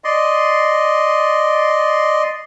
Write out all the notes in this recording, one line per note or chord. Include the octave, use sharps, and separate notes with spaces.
D5 D#5 C6